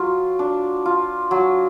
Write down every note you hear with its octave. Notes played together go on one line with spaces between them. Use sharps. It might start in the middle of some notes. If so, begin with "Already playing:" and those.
Already playing: F#3 F4
D4
F4
F#3